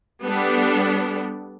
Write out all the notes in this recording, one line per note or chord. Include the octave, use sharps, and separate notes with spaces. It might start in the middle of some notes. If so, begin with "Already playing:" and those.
G3 B3 D4 A4